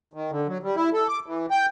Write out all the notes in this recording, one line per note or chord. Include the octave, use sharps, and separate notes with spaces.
D#3
D3
F#3
G3
E4
A4
D6
E3
G5